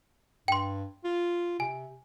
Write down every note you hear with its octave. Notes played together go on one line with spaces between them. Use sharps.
G2 G5 C6
F4
C3 G#5